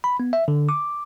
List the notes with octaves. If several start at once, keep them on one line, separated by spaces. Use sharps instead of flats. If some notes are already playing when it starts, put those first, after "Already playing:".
B5
B3
E5
D3
D6